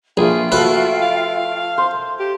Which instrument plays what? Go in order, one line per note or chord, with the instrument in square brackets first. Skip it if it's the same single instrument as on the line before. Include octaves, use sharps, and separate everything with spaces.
[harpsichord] A#1 [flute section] F4 E5 G5 [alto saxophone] G#4
[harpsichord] F3 B4 [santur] A3 [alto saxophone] F#4
[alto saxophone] F5
[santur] C5
[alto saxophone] G4 [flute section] A5